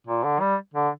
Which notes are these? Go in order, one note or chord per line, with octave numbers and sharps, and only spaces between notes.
A#2
D3
G3
D3